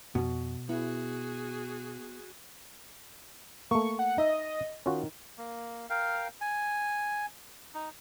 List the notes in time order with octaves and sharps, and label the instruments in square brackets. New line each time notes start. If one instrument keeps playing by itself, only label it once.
[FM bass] F2 [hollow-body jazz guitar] B2 [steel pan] F#4
[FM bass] B3 [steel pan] E4 [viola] F#4 G#4
[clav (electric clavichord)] A3 A#3 [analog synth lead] C#6
[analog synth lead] F#5
[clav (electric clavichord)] D#4 E5 [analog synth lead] D#5
[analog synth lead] D#3 [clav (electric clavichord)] C#4 F4 F#4
[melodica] A#3
A#4 F5 G5
G#5
D#4